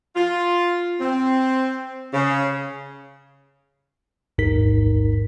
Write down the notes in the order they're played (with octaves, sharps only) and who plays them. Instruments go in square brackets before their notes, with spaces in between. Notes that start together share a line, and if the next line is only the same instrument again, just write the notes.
[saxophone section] F4
C4
C#3
[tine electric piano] A1 D#2 G#2 D#4 A#4 B6